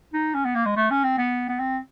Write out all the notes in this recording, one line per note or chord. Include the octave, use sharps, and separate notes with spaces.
D#4
C#4
B3
A#3
G#3
A3
C#4
C4
B3
B3
C4